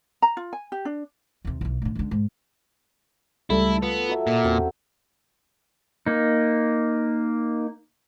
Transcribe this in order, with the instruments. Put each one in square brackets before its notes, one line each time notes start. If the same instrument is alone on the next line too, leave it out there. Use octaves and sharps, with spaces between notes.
[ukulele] A#5
F4
G#5
G4
D4
[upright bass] D#2 C3
B1 E3
A2 D3
C#2 D3
G#2
[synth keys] C#2 G3 A3 [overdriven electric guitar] E4 [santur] A4
[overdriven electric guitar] B3 [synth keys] F4
[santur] F#3 E5
[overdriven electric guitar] A#2
[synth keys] E2 [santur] F#3 C4 C#4
[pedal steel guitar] A#3 D#4